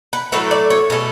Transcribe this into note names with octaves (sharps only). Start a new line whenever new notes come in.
B4
A2 F#3 A3 B4
D5
C#5
B2 A3 G#4